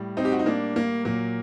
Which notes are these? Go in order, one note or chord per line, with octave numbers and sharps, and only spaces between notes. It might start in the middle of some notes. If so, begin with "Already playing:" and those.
Already playing: A2 G3
C4 D#4
G4
F#4
D#4
A#3 D4
A#3
A#2 F#3 A#3